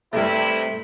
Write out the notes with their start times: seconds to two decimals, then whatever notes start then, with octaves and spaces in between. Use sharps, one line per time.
0.13 G2 C3 A3 E4